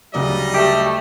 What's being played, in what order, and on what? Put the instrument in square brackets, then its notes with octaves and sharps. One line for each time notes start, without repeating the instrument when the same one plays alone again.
[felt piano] D2 C#3 F#3 [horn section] G3 D5 D#5
[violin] A3 [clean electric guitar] G4